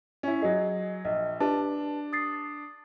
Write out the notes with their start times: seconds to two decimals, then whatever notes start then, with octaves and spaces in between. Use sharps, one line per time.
0.23 C#4 E4
0.42 F#3 G#4 D#5
1.05 A#1 D#5
1.40 D4 G4 B4 A5
2.13 D#6 A6 C7